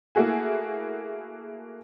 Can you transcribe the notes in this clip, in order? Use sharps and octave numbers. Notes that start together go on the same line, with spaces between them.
A3 A#3 E4 F#4 G#4 G#5